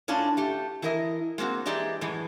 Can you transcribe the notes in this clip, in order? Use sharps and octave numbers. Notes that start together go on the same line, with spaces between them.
A2 C#4 D4 F4 A5
A3 G4
E3 E4 A#4 D#5
G#3 A#3 C4 F#4
E3 G#3 G4 D5 E5 A#5
F#2 A2 E3 G#3